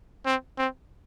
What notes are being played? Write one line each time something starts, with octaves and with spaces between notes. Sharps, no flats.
C4
C4